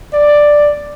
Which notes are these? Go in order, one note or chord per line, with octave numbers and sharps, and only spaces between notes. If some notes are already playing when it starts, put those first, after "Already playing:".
D5